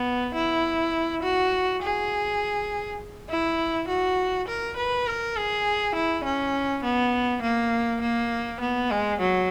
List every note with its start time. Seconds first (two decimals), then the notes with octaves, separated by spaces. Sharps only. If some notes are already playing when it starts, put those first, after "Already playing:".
Already playing: B3
0.34 E4
1.22 F#4
1.82 G#4
3.29 E4
3.88 F#4
4.48 A#4
4.77 B4
5.07 A#4
5.36 G#4
5.95 E4
6.24 C#4
6.84 B3
7.42 A#3
8.02 A#3
8.61 B3
8.91 G#3
9.20 F#3